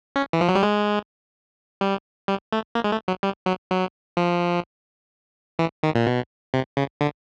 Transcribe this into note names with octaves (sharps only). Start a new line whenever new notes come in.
C#4
E3
F3
F#3
G3
G#3
G3
G3
A3
A#3
G#3
A3
F#3
G3
F#3
F#3
F3
E3
D#3
A#2
B2
C3
C#3
D3